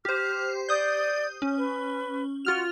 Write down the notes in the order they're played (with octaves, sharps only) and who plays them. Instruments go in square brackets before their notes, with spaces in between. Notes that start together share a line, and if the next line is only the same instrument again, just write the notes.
[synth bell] G4 C5 [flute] F6
[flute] D5 [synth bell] D#6 G6
[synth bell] C#4
[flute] B4
[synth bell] F4 F6 F7 [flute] F#4